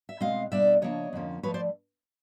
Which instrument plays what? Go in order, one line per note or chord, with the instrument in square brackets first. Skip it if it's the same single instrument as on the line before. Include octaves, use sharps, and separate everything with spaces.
[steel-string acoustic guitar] E5
B2 G#3 C4 D#5 F5
B2 G3 A#3 D4 D5 E5
C#3 F3 A#3 D4 C#5 D#5
F2 D3 F3 A#3 C#4
A2 F3 A3 B4 C#5
C5 D5